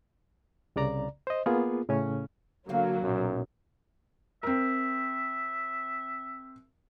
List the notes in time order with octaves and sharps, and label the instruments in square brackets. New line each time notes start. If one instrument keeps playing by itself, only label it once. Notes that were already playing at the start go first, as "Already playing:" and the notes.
[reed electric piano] C2 C#3 D5 A#5
C5 D#5
A#3 B3 F4 G#4
A2 C#3 C#4
[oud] E2 C4 F5 [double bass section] D3 A#3 [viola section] F#3
[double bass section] B1 A#2 [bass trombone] F#2
[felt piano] C4 A#4 [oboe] E5